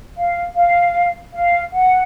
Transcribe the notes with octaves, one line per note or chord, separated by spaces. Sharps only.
F5
F5
F5
F#5